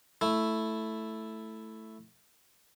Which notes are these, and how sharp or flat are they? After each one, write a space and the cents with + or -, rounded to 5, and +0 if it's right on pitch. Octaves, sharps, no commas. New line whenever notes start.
A3 +0 E4 +0